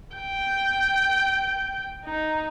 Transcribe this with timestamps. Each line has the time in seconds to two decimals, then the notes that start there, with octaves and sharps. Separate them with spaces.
0.16 G5
2.05 D#4